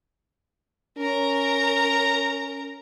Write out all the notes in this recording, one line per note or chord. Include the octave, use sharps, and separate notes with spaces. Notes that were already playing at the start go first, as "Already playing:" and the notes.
C#4 A#4 A#5